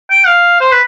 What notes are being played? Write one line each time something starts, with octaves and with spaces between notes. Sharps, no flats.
G5
F5
C5
B4